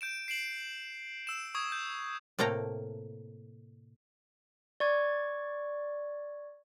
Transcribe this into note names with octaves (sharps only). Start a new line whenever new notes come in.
G6 D7 E7
C7 D7 E7 F#7
E6 E7
C#6 D#6 G#6
G6
A2 C3 A3 A#3 G5 A#5
D5 C#6 G#6